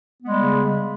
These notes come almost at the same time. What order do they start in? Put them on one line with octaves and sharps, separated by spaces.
B3 G#3 G3 C#3